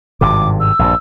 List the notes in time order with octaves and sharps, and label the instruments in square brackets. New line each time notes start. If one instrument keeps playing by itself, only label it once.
[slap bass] G#1 G2 C3 [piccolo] D6
[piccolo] E6
[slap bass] A#1 G2